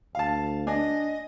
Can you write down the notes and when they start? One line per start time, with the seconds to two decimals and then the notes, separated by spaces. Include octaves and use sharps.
0.15 D2 F5 A5
0.67 D4 D#5 G#5